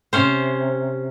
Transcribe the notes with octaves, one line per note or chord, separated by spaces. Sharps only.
C3 C#4 C5